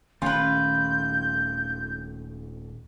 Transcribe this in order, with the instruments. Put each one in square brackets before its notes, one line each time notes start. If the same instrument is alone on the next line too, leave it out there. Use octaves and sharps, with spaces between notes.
[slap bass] D#1 D#3 A3 [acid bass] C#4 [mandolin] F4 B4 [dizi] G6